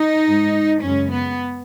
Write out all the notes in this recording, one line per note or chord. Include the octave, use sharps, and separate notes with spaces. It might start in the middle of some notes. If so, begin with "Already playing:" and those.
Already playing: D#4
G#2 G#3
F#2 C#3 G#3 C#4
B3